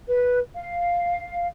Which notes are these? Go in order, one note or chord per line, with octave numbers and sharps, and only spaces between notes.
B4
F5